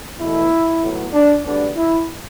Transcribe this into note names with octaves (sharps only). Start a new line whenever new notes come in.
E2 B2 A3 E4
A2 F#3 B3
D4
D2 D3 G3 B3 D4
E4